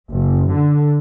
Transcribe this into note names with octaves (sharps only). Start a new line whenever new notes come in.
F#1
D3